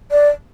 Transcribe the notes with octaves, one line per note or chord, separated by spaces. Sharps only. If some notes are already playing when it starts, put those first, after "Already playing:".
D5